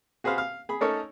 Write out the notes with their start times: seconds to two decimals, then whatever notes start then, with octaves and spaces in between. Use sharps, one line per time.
0.24 F#4 G#4 B4 C5 F5
0.38 F5
0.69 G#4 B5
0.81 A3 C#4 D#4 A4 A#4 C#5